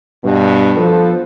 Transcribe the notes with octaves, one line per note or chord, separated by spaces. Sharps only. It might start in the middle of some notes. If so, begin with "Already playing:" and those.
G2 B2
F3 B3 A4